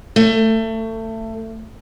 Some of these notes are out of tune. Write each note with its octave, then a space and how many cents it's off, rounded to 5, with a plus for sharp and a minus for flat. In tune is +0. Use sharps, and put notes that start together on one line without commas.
A3 +25